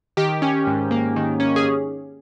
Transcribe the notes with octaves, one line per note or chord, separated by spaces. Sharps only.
D#3 G4
C#4
G#2
A#3
D#3
C#4
G#4